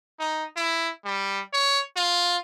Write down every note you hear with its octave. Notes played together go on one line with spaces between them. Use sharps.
D#4
E4
G3
C#5
F4